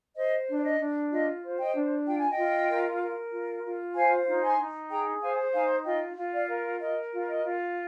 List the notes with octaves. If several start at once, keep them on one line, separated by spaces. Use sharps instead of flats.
C5 D#5
D4
D5
D#5
D4
F4 D#5
C5
D#5 G5
D4
F4 G5
G#5
D#5 G5
F4
A#4
A#4
F4
F4
C5 F5 G#5
D#4
G#5 C6
D#4
G#4 G5 A#5
C5 F5 G#5
D#4 F5 G#5
F4 D#5 G5
F4
D5 F5
A#4
A#4 D#5
F4
D#5
F4